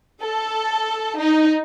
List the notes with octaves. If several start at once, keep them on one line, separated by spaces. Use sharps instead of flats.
A4
D#4